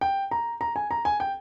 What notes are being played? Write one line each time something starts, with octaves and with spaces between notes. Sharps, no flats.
G5
A#5
A#5
G#5
A#5
G#5
G5